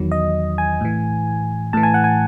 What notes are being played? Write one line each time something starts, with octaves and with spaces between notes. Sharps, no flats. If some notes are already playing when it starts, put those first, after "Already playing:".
Already playing: E2 D#3 F#3
D#5
G#5
A2 E3
A2 E3 A5
G#5
F#5
G#5